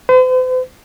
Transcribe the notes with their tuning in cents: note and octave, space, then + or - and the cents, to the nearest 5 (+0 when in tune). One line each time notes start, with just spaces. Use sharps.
C5 -45